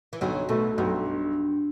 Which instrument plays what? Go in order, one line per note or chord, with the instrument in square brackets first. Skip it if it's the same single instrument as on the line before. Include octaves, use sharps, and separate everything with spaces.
[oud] E3
[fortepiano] B1 [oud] D3 F#3
[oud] B2 [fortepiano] A3
[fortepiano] B1 [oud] G2